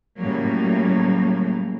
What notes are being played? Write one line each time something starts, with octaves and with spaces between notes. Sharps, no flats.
A2 C#3 F#3 G3 A#3